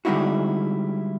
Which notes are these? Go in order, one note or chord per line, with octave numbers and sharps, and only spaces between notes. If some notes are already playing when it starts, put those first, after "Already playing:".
D3 G3 G#3 D#4 E4 F#4